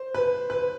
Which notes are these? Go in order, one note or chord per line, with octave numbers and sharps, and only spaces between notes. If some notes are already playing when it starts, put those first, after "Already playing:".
Already playing: C5
B4
B4